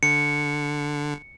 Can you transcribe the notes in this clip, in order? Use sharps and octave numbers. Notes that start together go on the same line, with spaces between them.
D3 C#7